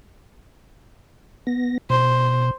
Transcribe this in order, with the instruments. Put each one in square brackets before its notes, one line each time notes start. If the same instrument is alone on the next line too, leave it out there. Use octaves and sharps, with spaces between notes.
[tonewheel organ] B3 A#6
[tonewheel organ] B2 [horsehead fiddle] C5